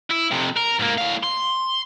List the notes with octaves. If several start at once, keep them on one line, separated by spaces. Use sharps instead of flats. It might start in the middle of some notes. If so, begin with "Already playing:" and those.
E4
F2 C3
A#4
G#2 A#3
A2 F5
C6